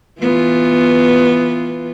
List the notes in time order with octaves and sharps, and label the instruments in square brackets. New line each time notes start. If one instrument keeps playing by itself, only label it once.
[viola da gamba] E3 B3 F4